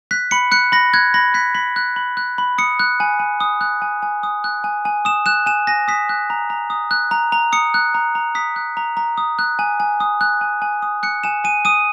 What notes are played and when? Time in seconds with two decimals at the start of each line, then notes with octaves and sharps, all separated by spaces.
0.11 F#6 B6
0.31 B5 C#7
0.52 F#6 C#7
0.72 B5 A#6
0.94 F#6 G#6
1.14 B5 A#6
1.34 F#6 B6
1.55 B5 B6
1.76 F#6
1.96 B5
2.17 F#6
2.38 B5
2.58 D#6 C#7
2.80 F#6
3.00 G#5
3.20 G#5
3.40 D#6
3.61 F#6
3.82 G#5
4.02 G#5
4.23 D#6
4.44 F#6
4.64 G#5
4.85 G#5
5.05 D#6 E7
5.26 F#6 E7
5.46 G#5 E7
5.67 G#5 A#6
5.88 D#6 B6
6.09 F#6
6.30 A#5
6.50 A#5
6.70 D#6
6.91 F#6
7.11 A#5
7.32 A#5
7.52 D#6 C#7
7.74 F#6
7.94 A#5
8.15 A#5
8.35 D#6 B6
8.56 F#6
8.77 A#5
8.97 A#5
9.18 D#6
9.39 F#6
9.59 G#5
9.80 G#5
10.00 D#6
10.21 F#6
10.41 G#5
10.62 G#5
10.82 D#6
11.03 F#6 C#7
11.24 G#5 E7
11.44 G#5 D#7
11.65 D#6 D#7